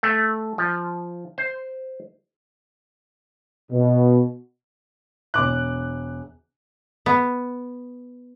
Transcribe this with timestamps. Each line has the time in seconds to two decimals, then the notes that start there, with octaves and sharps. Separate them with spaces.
0.03 A3
0.58 F3
1.38 C5
3.72 B2
5.34 E1 D6 F#6
7.06 B3